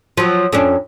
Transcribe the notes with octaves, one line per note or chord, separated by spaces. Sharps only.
F3 F#3
F2 C#4 D4